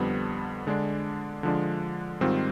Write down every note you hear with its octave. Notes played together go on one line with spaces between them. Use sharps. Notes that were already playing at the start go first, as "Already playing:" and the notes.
Already playing: F2 D3 G3 B3
D3 G#3 D4
D3 F3 G#3 D4
G#2 D#3 G3 C4 F4